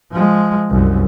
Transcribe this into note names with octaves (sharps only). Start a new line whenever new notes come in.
F3 G#3
C2 F#2